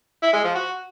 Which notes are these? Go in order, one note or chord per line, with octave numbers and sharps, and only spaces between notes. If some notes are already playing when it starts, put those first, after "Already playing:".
E4
G#3
F3
F#4